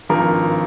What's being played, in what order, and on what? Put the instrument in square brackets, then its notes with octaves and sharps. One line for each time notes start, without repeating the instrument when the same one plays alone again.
[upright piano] G#1 G2 F3 A#4